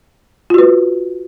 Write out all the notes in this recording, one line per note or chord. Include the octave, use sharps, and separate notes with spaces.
F4 F#4 B4